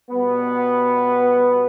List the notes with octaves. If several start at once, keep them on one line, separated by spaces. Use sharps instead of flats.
B2 G3 B3